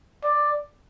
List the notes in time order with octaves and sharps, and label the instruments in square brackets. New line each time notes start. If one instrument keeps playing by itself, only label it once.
[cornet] D5